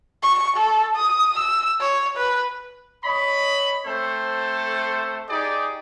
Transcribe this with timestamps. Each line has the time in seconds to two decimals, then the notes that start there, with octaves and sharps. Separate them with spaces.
0.23 C#6
0.57 A4
0.96 D#6
1.39 E6
1.81 C#5
2.18 B4
3.05 C#5 D#5 B5
3.86 A3 C4 A4 C5
5.29 D#4 G4 G#4 D5